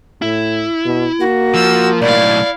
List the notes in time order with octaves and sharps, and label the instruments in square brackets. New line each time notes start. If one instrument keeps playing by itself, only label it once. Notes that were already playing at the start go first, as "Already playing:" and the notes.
[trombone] A2 [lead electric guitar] E4
[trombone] B2
[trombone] A#3 [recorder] F#4
[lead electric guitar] F3 [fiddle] E6
[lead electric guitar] B1 A2 [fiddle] E4 F5 [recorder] D5